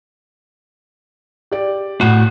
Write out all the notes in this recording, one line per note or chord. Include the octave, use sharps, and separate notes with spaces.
G4 D5
A2 F#4 F#5